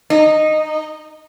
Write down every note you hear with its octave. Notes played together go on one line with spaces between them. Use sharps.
D#4